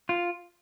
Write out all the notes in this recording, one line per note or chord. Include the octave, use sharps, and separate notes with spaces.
F4